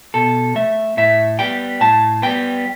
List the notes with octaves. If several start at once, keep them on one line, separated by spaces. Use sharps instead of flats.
B2 A4
A3 E5
A2 E5
G3 B3 G5
A2 A5
G3 B3 G5